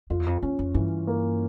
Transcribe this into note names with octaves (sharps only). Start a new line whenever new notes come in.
F2 F4
E2
F2
E2 C#4
F2
G2 E3
A#3